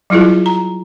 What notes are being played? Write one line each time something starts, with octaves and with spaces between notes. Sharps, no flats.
F#3 G3 E4 F4 G#4
A#5